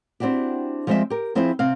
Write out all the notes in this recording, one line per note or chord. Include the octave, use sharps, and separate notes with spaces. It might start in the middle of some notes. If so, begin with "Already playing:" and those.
C4 D4 E4 F#4 G4
F3 G3 G#3 C4 D#5 E5
G4 A#4
F3 C4 E4 G#4 C5 E5
C3 C4 F5